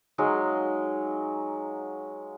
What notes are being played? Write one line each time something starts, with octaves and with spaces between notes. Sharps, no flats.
F#3 G#3 D#4 F5